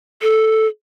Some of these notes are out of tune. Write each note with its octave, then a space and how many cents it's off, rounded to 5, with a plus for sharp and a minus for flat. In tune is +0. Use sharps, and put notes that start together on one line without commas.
A4 +0